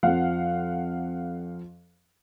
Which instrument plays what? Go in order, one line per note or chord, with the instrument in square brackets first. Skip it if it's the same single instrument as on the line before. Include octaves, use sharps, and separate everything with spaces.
[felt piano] F2 F3 [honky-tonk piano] F5 F#5